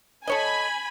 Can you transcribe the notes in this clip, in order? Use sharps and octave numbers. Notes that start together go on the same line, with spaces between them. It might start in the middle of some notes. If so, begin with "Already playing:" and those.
A4 C#5 D#5 G#5 B5